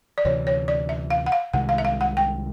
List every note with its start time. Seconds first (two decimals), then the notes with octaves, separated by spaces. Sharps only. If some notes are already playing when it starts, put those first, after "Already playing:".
0.18 D5
0.25 D2 C3 E3 C#5
0.47 C#5
0.68 D5
0.89 E5
1.10 F5
1.26 F#5
1.32 F5
1.53 C2 C3 D#3 G#3 F#5
1.69 F5
1.78 E5
1.85 F5
2.01 F#5
2.17 G5